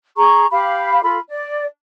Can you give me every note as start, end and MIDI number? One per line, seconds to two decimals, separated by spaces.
0.17 0.45 68
0.17 0.45 82
0.17 0.45 85
0.52 1.00 67
0.52 1.00 77
0.52 1.00 83
1.03 1.19 65
1.03 1.19 69
1.03 1.19 83
1.28 1.65 74